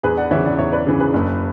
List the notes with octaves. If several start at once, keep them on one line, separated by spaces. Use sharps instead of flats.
E2 G#4 B4
D5 F#5
C#3 E3 C#5 E5
D5 F#5
E2 C#5 E5
B4 D5
C#3 E3
G#4 B4
F#1